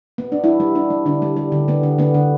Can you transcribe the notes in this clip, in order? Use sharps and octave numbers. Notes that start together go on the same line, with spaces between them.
B3
D4
G3 E4
G3
G3 D4
G3
D3 D4
G3
G3
D3
D3 B3
D3
D3 B3
D3